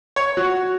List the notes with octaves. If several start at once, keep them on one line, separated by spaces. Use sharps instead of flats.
C#5
F#4